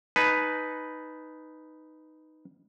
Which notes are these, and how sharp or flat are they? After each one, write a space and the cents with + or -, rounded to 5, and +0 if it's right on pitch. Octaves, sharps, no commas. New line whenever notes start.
D#4 +0 B4 +0 G#5 +45